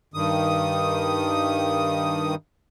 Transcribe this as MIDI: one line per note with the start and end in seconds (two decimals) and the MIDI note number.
0.14 2.35 43
0.14 2.35 51
0.14 2.35 87